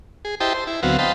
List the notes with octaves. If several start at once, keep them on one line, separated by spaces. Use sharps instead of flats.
G#4
E4 G4 C5 D#5 G5 A5
C5
E4
D2 F#3 B3 C4 F5 F#5
C5 D#5 F5 G5 A5 B5